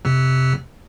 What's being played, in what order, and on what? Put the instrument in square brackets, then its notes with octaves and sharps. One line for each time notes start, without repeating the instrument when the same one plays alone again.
[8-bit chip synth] F2 C3